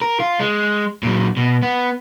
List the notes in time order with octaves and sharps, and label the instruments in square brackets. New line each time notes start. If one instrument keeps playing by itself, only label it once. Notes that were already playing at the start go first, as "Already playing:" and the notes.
[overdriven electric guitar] A#4
F4
G#3
A#2 F#3
B2
B3